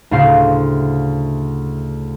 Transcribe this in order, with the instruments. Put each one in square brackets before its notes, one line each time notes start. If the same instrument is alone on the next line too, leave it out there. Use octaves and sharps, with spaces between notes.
[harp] D2 A2 C#3 C5 F5 C6